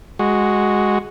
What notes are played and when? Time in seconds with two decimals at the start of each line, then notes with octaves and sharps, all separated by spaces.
0.19 G#3 F#4